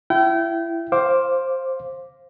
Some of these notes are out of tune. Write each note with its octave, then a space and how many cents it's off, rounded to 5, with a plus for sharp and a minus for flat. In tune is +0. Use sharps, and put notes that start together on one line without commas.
E4 +25 G5 -30
C5 +10 F5 +0 D6 +0